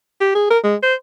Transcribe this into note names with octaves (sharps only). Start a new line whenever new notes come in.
G4
G#4
A#4
G#3
C5